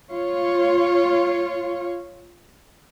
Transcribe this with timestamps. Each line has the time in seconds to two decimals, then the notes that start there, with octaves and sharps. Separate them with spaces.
0.12 F4 C#5